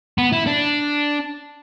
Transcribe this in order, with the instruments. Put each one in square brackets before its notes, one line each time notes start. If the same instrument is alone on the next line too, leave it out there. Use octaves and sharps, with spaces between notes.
[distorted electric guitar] B3
E4
D4